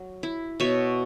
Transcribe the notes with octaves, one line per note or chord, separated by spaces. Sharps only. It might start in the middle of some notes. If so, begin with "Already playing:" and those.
Already playing: F#3
E4
B2 C#5 E5